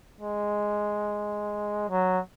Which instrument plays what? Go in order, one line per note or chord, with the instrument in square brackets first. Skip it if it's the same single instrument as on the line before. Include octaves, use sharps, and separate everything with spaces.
[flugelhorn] G#3
F#3